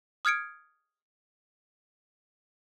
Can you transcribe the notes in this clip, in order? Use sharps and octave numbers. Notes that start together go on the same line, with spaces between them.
D#6 F6 G#6 C#7 D7